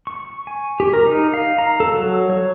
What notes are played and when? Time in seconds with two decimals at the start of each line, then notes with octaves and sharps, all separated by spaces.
0.07 C#6
0.47 G#5
0.80 G4
0.93 A#4
1.07 D#4
1.34 F5
1.58 A#5
1.80 A4
1.94 F#3
2.30 C#5